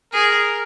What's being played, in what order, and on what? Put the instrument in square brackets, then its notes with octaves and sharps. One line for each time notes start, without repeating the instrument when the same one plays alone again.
[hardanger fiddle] G#4 [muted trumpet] A#4